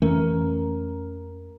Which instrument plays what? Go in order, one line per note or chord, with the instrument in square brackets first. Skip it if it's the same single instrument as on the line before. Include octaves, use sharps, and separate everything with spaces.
[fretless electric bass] F2 E3 A3 [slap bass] C#4 [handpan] A#4